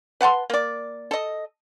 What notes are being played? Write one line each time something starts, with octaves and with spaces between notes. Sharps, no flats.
B4 F#5 A5 C6
A#3 D5
A4 D#5